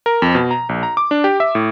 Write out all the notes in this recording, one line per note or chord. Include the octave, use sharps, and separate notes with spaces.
A#4
F2
B2
A#5
A#1
A#5
D6
D4
G4
E5
A2